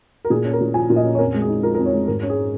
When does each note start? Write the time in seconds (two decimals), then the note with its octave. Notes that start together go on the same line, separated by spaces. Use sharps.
0.25 A#4
0.30 A#2 G#4
0.45 C#4
0.53 A#4
0.61 A#2
0.74 F3 G#5
0.90 A#2
0.96 D#5
1.04 C#4
1.15 C#5
1.18 F2 A#4
1.34 G#3
1.42 G#4
1.49 D#4
1.63 F3 A#4
1.74 F2 A#4
1.86 C#5
1.92 G#3
2.07 G#2 A#4
2.23 C#4
2.30 G#4